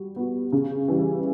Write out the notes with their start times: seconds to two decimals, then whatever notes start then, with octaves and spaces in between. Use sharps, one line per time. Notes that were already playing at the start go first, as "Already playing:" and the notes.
Already playing: G3 F#4
0.16 B3 F#4
0.52 C#3
0.88 E3 G3